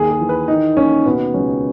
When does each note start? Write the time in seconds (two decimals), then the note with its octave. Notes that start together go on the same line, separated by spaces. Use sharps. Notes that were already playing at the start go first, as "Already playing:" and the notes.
Already playing: D#2 G#4
0.11 G#4
0.20 E3
0.29 B4
0.48 D#3 D#4
0.77 D#2 C#4
1.06 B2 B3
1.34 C#2 C#4